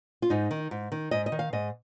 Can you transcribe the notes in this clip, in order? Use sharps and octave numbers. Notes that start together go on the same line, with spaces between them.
F4
G#2 D#4
D#3
G#2
D#3
G#2 D#5
D#5
D#3
F5
G#2 D#5